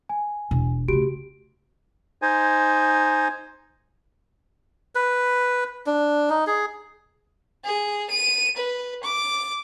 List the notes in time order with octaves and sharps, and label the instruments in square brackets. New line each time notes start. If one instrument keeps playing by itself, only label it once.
[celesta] G#5
[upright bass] E1
[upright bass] C#3 A3 [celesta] F#4 G4 D7
[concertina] D#4 C5 G#5
[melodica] B4
D4
D#4
G#4
[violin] G#4
D#7
B4
D6